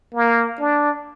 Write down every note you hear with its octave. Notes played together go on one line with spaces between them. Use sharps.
A#3
D4